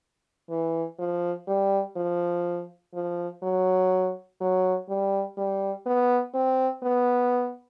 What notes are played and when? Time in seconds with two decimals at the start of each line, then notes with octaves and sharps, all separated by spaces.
0.50 E3
0.99 F3
1.48 G3
1.96 F3
2.94 F3
3.42 F#3
4.40 F#3
4.89 G3
5.37 G3
5.86 B3
6.34 C4
6.83 B3